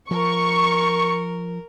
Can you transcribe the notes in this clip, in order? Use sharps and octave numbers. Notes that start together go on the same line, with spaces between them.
F3 A#4 C#6